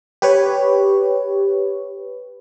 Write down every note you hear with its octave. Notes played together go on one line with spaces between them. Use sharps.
G4 B4 C#5